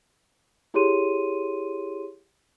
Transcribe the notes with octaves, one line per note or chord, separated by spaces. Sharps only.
E4 G4 G#4 C#5 C6 D#7